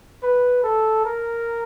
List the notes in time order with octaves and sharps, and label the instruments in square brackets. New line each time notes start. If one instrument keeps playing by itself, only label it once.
[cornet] B4
A4
A#4